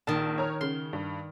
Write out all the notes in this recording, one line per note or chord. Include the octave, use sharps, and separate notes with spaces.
A#1 D#3 A5
C#5 A#5 F6
C#3 C6
G2